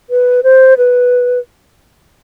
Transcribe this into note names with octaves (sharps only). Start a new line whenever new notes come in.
B4
C5
B4